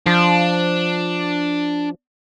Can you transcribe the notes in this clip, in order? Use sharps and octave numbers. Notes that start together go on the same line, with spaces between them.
F3 D4